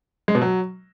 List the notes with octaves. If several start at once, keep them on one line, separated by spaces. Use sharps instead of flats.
G#3
B2
F#3